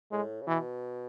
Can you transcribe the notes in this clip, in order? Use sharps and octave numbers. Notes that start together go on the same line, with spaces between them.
A2 G#3
C#3
B2 E3